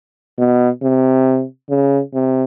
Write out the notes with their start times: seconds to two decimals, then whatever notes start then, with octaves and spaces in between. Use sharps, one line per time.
0.38 B2
0.82 C3
1.70 C#3
2.13 C3